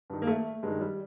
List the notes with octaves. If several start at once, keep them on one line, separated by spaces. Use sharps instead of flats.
G2 D#3
A#3
A3
G2 D#3 G#3
G3